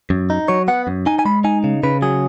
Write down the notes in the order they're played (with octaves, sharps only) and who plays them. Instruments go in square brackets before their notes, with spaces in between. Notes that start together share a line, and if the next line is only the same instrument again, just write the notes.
[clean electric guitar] F#2
D#4
F#3 C#5
B3 F#5
F#2
D#4 G#5
G#5
G#3 B5
D#4 G#5
C#3
C#3 B4
F#3 G#4